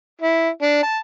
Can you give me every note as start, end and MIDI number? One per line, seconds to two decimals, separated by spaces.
0.21 0.49 64
0.62 0.80 62
0.83 0.97 81